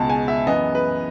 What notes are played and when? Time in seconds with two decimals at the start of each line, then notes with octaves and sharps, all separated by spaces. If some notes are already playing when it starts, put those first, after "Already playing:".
Already playing: C#2 B2 G#3 A5
0.10 G#5
0.28 E5
0.47 F#2 E3 B3 D#5
0.75 B4